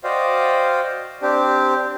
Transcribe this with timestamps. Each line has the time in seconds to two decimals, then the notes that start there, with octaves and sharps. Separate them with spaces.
0.04 F#4 C5 D5 D#5 F5 G5
1.22 C4 D4 G4